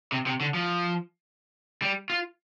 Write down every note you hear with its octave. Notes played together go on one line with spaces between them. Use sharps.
C3
C3
D3
F3
G3
F4